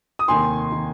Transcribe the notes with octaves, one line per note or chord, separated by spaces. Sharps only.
D#6
F1 D#2 D#3 G#5 C6
D#3